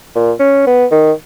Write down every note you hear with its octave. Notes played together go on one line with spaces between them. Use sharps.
A#2
C#4
B3
D#3